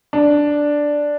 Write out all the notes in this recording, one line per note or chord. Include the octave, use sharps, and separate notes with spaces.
D4